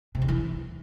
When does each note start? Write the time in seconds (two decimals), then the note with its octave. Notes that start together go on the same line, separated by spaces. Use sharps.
0.15 C3
0.22 E2
0.28 E3